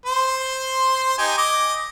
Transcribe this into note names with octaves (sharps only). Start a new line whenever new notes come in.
C5 C6
D#4 G4 G#5
D#5 D6